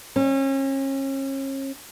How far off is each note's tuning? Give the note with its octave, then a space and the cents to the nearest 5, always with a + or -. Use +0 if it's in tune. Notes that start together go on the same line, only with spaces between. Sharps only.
C#4 -35